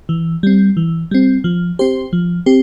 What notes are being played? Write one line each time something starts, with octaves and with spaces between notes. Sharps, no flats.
E3
G3 C4
E3
G3 C4
F3
C4 G4 C5
F3
C4 G4